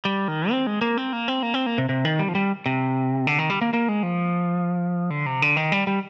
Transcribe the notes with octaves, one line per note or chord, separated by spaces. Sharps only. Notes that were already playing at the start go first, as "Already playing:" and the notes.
G3
D#3
C4
G#3
A#3
C4
A#3
C4
A#3
C4
A#3
C3
C3
D#3
G3
F3
G3
C3
D3
D#3
G3
A#3
A#3
G#3
F3
D3
C3
D3
D#3
G3
G3